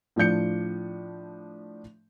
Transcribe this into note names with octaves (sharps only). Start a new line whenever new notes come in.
A2 F3 D4 G6 C#7